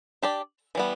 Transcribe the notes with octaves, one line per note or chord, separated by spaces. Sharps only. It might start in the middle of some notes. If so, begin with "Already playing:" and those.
D4 G4 D5
E3 G3 B3